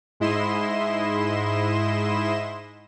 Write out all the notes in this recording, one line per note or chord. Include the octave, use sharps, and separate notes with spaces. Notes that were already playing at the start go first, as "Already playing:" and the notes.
G#2 G#3 E4 D#5 C6 E7